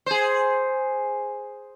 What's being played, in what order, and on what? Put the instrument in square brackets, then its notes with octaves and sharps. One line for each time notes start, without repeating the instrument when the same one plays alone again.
[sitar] G#4 C5